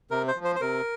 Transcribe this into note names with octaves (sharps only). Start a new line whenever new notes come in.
C3 A#4
C5
F3
C5
C5
C3 A#4